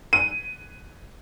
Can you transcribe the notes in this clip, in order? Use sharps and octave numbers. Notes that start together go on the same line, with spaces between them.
D#7